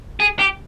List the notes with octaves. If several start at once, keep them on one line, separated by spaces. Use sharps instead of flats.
G#4
G4